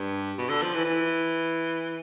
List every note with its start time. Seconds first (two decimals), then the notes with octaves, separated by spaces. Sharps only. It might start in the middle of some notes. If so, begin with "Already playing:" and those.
Already playing: G2
0.38 B2
0.49 D3
0.62 F3
0.74 E3
0.85 E3